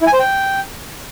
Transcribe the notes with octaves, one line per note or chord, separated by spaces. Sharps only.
E4
G#5
C5
G5